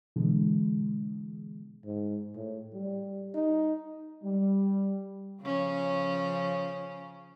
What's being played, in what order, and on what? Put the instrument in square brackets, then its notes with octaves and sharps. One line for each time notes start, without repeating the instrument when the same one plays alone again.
[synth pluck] B2 D3 E3 G#3
[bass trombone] G#2
A2
G3
D#4
[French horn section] G3
[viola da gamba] C#3 F3 C#4